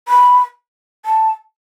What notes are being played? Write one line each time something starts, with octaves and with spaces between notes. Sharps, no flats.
B5
A5